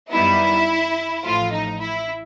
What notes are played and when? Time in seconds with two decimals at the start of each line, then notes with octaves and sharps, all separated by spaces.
0.11 F#2 D#3 G3 B3 D#4 E4
1.23 A1 A2 F3 A3 F4
1.53 D#4
1.80 E4